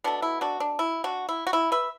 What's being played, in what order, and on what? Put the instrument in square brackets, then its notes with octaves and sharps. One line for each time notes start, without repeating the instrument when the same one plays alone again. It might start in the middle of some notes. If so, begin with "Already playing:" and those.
[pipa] B2 A3 D4
E4
D4 F#4
D4
E4
D4 F#4
E4
F#4
E4
B4 E5